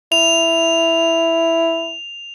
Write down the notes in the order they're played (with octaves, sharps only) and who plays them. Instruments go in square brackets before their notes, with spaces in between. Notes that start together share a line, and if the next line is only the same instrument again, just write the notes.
[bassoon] E4 [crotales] F7